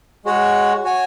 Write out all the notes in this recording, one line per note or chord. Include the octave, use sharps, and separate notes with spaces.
G#3 F#4 C#5 F#5
F#4 C#5 G#5